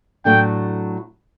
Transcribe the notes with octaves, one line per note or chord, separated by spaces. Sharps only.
A2 F#3 A3 D4 G5